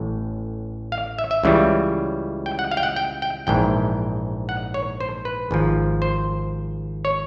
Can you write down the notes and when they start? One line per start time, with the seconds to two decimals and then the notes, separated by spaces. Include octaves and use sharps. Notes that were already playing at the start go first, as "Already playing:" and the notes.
Already playing: A1 A2
0.92 F5
1.19 E5
1.31 E5
1.44 C#2 C#3 E3 G3
2.46 G5
2.59 F#5
2.71 F5
2.77 G5
2.83 F#5
2.96 G5
3.22 G5
3.47 A#1 G#2 E3 G5
4.49 F#5
4.74 C#5
5.01 C5
5.25 B4
5.51 G#1 G#2 F3
6.02 C5
7.05 C#5